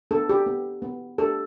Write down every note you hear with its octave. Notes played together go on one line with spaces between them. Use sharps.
B3 A4
G4
B3
B3
G4 A4